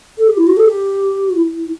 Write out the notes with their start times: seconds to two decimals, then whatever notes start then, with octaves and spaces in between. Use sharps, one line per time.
0.18 A4
0.28 G4
0.37 E4
0.47 F#4
0.57 A4
0.66 G4
1.35 E4